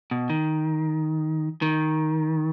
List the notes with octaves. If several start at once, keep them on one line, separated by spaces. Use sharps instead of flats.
B2
D#3
D#3